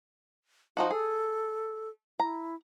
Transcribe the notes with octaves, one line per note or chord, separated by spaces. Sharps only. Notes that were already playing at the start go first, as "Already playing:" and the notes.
F3 D#4 F4 F#4
G#4 A4
E4 A#5